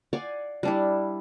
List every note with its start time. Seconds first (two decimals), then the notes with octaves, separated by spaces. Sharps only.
0.13 D5 F5 F#5 G#5
0.63 G3 D4 E4